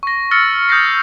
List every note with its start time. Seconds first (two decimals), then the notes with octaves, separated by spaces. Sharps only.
0.03 C#6 A#6
0.31 E6 F6 A6 A#6 C#7
0.69 D#6 G6 A6 A#6 C7